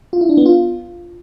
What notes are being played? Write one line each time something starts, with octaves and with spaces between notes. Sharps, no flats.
F4
E4
D4
B3
F4